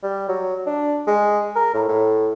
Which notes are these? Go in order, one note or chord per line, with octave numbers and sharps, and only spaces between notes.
G3
F#3
D4
G#3
A#4
A2
A2